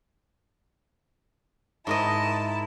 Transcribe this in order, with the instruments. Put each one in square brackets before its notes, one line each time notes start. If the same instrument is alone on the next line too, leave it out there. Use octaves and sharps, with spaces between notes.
[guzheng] G#2 A#4 D#5 [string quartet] E4 A5